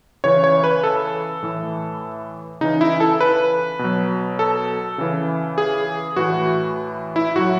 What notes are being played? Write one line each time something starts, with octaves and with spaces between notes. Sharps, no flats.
C#3 E3 C#5
C#5
B4
A4
A2 E3
C#3 E3 D#4
E4
A4
B4
B2 F#3
A4
C#3 E3
G#4
A2 E3 F#4
E4
A2 F#3 F#4